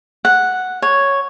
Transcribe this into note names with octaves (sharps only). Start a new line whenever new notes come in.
F#5
C#5